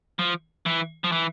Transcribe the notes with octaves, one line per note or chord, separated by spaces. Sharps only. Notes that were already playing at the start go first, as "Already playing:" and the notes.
F3
E3
F3
E3